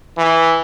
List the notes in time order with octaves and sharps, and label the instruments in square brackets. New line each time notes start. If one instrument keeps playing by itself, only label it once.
[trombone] E3